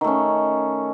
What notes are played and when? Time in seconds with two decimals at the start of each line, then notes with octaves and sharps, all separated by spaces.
0.01 D#3
0.04 A3
0.07 C#4